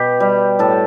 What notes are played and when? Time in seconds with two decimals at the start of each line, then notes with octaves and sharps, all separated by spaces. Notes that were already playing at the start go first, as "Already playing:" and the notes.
Already playing: B2 G4
0.20 G3
0.59 A2 A4